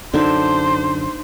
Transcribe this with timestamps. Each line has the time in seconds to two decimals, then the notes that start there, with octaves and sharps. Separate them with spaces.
0.14 F#2 D3 D4 D#4 C5 E5